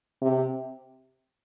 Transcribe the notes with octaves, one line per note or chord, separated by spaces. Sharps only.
C3